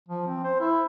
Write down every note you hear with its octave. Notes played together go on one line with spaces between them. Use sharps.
F3
C4
C5
E4